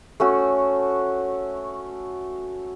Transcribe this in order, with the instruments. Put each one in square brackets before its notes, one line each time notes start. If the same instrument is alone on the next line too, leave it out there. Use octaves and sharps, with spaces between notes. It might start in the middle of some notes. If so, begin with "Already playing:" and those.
[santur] A3 C#4 F#4